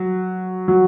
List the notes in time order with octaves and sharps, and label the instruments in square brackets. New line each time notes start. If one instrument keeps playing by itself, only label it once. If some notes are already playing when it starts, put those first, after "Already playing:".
Already playing: [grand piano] F#3
F#3